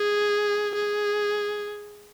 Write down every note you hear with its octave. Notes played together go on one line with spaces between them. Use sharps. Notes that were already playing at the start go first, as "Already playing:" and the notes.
Already playing: G#4
G#4